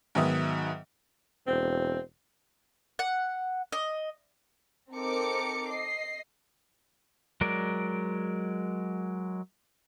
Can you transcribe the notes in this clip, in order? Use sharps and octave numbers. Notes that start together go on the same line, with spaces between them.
G#2 D#3 F#3 B3 E5 D#6
E1 C4
F#5
D#5
C4 D#4 A4 A#4 D6 C#7
D#5 C7
F#3 G#3 A#4 D5